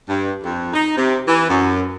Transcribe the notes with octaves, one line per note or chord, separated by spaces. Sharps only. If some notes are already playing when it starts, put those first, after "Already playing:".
G2
F2
D#4
C3
E3
F#2